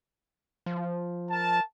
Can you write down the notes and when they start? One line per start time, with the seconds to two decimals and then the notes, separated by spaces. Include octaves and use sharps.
0.66 F3
1.30 A#4 A5